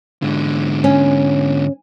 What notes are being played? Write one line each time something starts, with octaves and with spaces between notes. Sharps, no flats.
G#2 D3
C#4